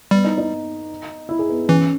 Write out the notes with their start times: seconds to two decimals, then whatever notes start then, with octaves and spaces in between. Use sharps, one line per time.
0.11 G3 B3
0.24 D#4
0.38 D#4
1.29 E4
1.39 G#4
1.49 B3
1.69 E3 C#4